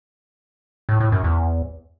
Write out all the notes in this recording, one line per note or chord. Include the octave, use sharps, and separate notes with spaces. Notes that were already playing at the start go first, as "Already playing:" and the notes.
A2
A2
F#2
E2